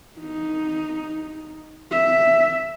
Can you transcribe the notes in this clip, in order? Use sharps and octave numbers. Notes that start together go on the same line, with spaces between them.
D#4
E5